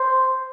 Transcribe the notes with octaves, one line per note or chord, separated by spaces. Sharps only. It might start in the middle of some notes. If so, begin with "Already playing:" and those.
Already playing: C5